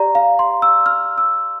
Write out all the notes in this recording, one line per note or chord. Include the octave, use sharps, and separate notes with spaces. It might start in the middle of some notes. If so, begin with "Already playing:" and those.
Already playing: G4 D5 A#5
F5
C6
E6
F6
E6